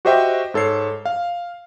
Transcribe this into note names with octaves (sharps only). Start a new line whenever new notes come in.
F#4 G4 C5 D#5 E5 G5
G#2 A4 C#5 C7
F5